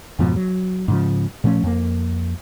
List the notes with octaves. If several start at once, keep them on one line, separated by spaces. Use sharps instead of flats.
F2 G#2 B2 F3
F#3
G#2 C#3 F3
A#2 F3 A3 C#4
F2 A#3